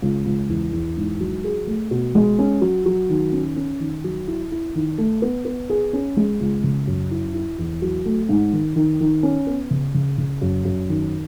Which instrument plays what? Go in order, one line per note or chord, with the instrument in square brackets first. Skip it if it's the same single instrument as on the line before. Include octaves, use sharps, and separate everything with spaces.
[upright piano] C#2
C#2
E2
E2
G#2
F#3
G#4
A3
B2
G#3
C#4
F#3
F#3
D#3
C#4
C#4
D#3
F#3
E4
E4
D#3
A3
B3
B3
G#4
C#4
G#3
C#2
C#3
F#2
E4
E4
E2
F#3
A3
G#2
D#3
D#3
D#3
C#4
B3
C#3
C#3
C#3
F#2
F#2
D#3